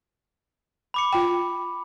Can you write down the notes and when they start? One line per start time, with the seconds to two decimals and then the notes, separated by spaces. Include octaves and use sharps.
0.94 B5 D6 C#7
1.13 F4 G5